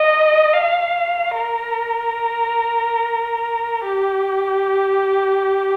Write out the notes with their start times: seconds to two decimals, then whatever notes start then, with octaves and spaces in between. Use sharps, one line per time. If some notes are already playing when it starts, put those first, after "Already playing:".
Already playing: D#5
0.53 F5
1.36 A#4
3.86 G4